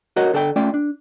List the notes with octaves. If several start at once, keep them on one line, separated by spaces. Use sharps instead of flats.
F#4 A#4 C#5 D#5
D3 A4 D5 G5
A3 C#4 F4 D5 G5
D4